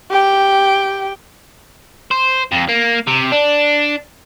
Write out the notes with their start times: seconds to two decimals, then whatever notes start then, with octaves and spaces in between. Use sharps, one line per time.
0.11 G4 G5
2.11 C5
2.52 F2
2.69 A#3
3.07 C3
3.32 D4